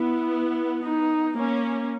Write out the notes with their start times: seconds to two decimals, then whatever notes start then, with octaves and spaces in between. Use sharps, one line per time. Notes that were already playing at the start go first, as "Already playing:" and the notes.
Already playing: B3 E4
0.83 D#4
1.38 A#3 C#4